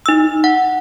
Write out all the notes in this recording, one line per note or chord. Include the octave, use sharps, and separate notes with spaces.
D#4 E6
F#5